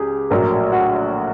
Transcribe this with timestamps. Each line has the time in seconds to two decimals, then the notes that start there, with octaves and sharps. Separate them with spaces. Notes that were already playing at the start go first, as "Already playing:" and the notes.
Already playing: C#2 G4 G#4
0.30 A#1 A2 F#3 A#4
0.72 F#4